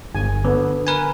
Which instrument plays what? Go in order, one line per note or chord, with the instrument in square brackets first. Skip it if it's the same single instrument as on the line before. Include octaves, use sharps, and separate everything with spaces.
[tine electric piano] G1 [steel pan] G#5
[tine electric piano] D3 [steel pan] B3
[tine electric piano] A#4 B4 G#5